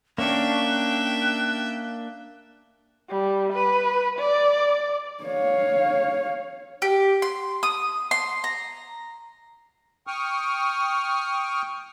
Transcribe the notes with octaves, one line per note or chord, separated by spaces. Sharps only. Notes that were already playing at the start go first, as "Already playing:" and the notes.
A#3 C#4 D4 C#5 D5 E5 G5 F#6
G3
B4
D5
C#5 F5
G4
C6
D#6
C6
A#5
G5 C#6 D#6 F6